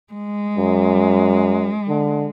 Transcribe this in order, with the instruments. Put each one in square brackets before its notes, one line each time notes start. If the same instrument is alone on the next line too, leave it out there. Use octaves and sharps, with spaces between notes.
[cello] G#3
[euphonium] F#2
D3